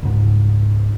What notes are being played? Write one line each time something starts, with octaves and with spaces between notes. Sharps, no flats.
C#2 G#2